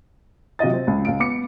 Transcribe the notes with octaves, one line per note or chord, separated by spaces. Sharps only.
C3 F#3 F4 D#5 A6
C4
C#2
C#2 F5 D7
B3 D6 C#7